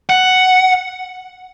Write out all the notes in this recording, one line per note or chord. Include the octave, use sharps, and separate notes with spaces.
F#5